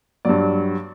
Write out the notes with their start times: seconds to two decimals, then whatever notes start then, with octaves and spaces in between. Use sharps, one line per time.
0.25 G2 F#3 D5